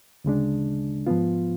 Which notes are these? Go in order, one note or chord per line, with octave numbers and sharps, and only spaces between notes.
D2 C#3 G#3 D4
G#2 F3 B3 F4